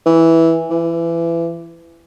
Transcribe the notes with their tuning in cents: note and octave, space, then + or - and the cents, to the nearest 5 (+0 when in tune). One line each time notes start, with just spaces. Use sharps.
E3 -5
E3 +25